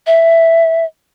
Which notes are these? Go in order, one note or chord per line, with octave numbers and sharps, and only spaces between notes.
E5